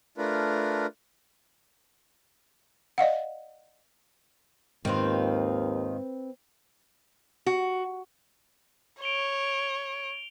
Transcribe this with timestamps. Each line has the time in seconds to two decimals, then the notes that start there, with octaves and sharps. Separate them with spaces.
0.18 A3 D4 F4 A#4 B4
2.98 D5 D#5 F5 F#5
4.85 D#2 G#2 D#3 C4 F4 B4
7.46 F#4
9.02 C#5 D7 F7 G7